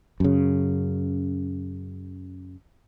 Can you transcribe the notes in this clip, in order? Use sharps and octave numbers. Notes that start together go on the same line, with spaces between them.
F#2 C#3